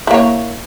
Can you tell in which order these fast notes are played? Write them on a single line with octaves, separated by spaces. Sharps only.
E4 A#3 C#5